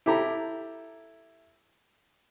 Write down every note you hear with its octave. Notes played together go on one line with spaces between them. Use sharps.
E4 G4 A4 A#5